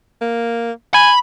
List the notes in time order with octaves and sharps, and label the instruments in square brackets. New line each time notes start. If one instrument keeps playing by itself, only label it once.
[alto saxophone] A#3
[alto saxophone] G#5 [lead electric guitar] B5